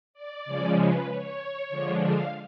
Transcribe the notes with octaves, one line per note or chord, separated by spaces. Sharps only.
D5
C#3 F3 G#3 C#4
B4
C#5
D3 F3 G#3 D4
F5